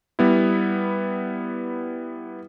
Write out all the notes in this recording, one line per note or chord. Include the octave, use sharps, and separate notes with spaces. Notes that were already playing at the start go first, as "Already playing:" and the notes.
G3 B3 E4